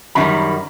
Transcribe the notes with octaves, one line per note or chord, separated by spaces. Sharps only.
F#2 D#3 G3 B5